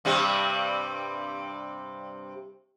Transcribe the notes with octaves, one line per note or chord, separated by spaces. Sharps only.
G2 C3 G3